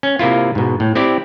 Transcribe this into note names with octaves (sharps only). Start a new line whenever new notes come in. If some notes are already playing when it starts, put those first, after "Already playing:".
C#4
C3 A#3 E4 F4
G#2 B2
A2
C4 E4 G4 D5